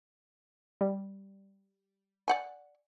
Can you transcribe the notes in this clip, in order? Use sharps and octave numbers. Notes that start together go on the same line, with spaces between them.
G3
D5 F#5 G#5